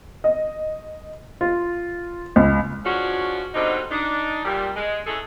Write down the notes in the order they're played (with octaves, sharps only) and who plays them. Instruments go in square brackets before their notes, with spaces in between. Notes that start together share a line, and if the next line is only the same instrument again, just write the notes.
[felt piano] D#5
F4
C#2
[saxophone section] F3 G#3 C#4 D4 F4 F#4
B2 D3 G3 C4 D#4
D4 D#4
A#2 G3
G#3
E3 C#4 G#4 A4